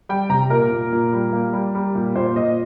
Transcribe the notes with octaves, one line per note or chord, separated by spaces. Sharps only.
G3 G5
C3 A#5
A#2 A#4
A#2
A#2
G3
A#3
G3
G3
A#2
A#2 C5
A#2 D#5